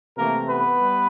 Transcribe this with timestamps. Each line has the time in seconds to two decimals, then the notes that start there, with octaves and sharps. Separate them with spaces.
0.17 C3 E3 A3 A#3 A#4
0.48 B3 B4
0.79 G3